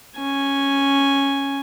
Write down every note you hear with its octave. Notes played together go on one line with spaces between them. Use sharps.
C#4 G#5